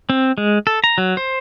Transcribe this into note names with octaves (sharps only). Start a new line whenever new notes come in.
C4
G#3
A4
A#5
F#3
C5